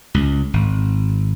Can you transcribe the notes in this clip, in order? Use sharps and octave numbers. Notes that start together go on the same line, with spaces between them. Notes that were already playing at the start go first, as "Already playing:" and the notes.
C#2
G#1